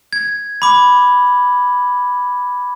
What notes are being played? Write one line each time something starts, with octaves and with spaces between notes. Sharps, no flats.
G#6
B5 D6